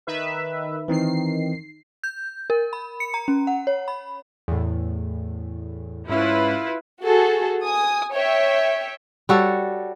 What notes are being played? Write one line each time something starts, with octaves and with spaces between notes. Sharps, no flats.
D#3 B4 E5
D#3 E3 C4 D#4 C7
G6
A#4
B5
C#7
A#5
C#4
F#5
C#5
B5
E2 A2
G#2 C#4 E4 F4 B4
F#4 G#4 A4
G#5 D#6
C#5 E5 G5
G3 F#4 A4 C#5